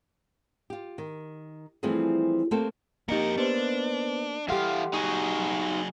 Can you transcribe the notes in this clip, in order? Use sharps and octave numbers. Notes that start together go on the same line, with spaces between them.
F4 G4
D#3
E3 F3 G3 A3 C4 G#4
A3 A#3 C4 G4 A4 C5
F2 A#3 D#4 G4 A#4 D#5 C#7
B3 D4 B4 C5
E3 G3 G4 A4 F5 F#5 C6
F#3 D#4 F#4 G#4 C#6